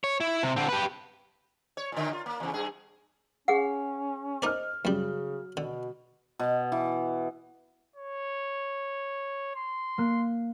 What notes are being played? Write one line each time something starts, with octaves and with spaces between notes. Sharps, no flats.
C#5
E4
C3
D3 C4
G4 B4
C#5
A#2 D3
F4
A#3
E2 C#3
G2 G#4
C#4 G#4 F#5
D#4 A#4 C5 D5 D#5 F6
F#2 C#3 F#3 G3
B2 D3
B2
E3
C#5
C6
A#3 F#6